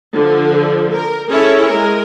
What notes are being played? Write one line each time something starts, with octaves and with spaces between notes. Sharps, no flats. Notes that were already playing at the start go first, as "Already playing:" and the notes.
D3 F3
A#4
C#4 E4 G#4 A4 C#5
G#3 A#4